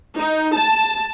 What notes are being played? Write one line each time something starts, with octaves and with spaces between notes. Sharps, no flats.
D#4
A5